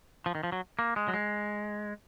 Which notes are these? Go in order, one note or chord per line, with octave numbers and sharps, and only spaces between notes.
F3
D#3
F3
F#3
A#3
G#3
F#3
G#3